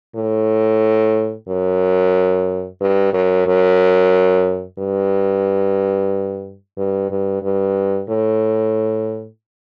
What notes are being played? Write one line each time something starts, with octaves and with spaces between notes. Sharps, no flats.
A2
F#2
G2
F#2
F#2
G2
G2
G2
G2
A2